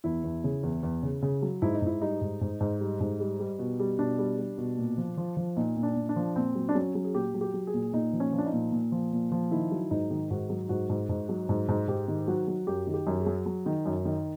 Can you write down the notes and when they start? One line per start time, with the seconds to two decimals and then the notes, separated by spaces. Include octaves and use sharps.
0.04 E2 E4
0.24 E2
0.44 C#3
0.63 E2
0.83 E2
1.03 C#3
1.22 C#3
1.42 F#3
1.62 G#2 E4
1.74 D#4
1.82 G#2 E4
2.01 G3 D#4
2.21 G#2
2.41 G#2
2.60 G#2
2.81 G3
3.00 G#2
3.20 G3
3.40 G3
3.59 B2
3.80 G3
3.99 B2 D4
4.18 G3
4.38 G3
4.58 B2
4.78 A#2
4.98 F3
5.17 F3
5.37 F3
5.57 A#2 D#4
5.76 A#2
5.83 D4
5.96 A#2
6.09 D4
6.16 F3
6.36 A#2 C4
6.55 F#3
6.69 D4
6.75 F#3 C#4
6.95 F#3
7.04 G#4
7.15 A#2 G4
7.34 F#3
7.41 G4
7.54 F#3
7.67 G#4
7.74 A#2
7.93 A#2 D#4
8.13 F3
8.20 C#4
8.33 F3
8.38 D4
8.46 D#4
8.53 A#2
8.72 A#2
8.92 F3
9.12 A#2
9.32 F3
9.51 D#3 E4
9.72 F#3
9.91 G#2 D#4
10.11 D#3
10.30 G#2 F#4
10.50 F#3
10.69 G#2 F#4
10.89 G#2
11.09 G#2
11.29 F#3
11.49 G#2
11.68 G#2
11.88 G#2 G4
12.08 D#3
12.27 F#3 F#4
12.47 F#3
12.67 F#2 G4
12.87 D#3
12.94 G4
13.07 F#2
13.20 G#4
13.26 F#3
13.46 F#3
13.66 D#3
13.86 F#2
14.05 D#3